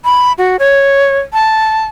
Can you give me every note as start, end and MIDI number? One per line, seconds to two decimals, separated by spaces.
0.05 0.33 83
0.38 0.57 66
0.59 1.19 73
1.33 1.85 81